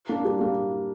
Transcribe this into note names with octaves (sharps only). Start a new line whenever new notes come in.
A#3 D4
G3
A#3